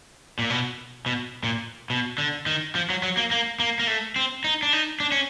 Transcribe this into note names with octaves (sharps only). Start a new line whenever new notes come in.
A#2
B2
B2
A#2
B2
D3
D#3
F3
F#3
F#3
A#3
A#3
A#3
A#3
A3
C4
D#4
D4
D#4
D4
C#4